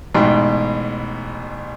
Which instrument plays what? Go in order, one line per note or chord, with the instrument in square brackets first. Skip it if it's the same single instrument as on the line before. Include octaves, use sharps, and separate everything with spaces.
[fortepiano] A1 G#2 B2 G5 C6